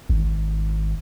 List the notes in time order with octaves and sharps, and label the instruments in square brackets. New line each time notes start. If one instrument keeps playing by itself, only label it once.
[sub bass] G#1